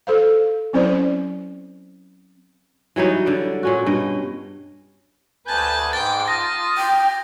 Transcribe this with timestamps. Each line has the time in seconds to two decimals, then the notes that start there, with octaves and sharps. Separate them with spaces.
0.07 A4 C5 F5
0.73 F#3 C4 C#4 E4 C5 D5
2.96 E3 F#3 G3 D#4
3.26 D3 D5
3.63 A#2 C#4 F#4
3.86 G2 B2 D#5
5.46 D2 B4 G#5 A5 G6
5.93 G#2 G5 D6 A6
6.28 F4 A5 D#6 A#6
6.78 G5